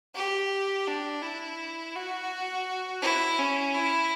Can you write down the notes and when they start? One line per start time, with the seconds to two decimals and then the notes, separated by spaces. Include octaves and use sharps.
0.15 G4
0.87 D4
1.22 E4
1.95 F#4
3.01 E4
3.38 C#4
3.74 E4